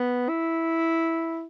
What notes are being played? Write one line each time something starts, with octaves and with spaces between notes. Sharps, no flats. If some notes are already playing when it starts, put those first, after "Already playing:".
Already playing: B3
E4